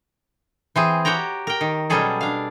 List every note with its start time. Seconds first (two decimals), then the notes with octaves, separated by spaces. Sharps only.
0.76 E3 C4 G#4
1.05 F#4 G4 C#5 G5 A#5
1.47 A#4 G5
1.61 D#3
1.90 B2 F#3 G3 C#4 G#4 A4
2.21 D4 F5